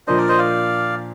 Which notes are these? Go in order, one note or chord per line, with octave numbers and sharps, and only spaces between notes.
A#2 F3 A#3 D4 C5 D#5
A#4 D5
C5 D#5
D5 F5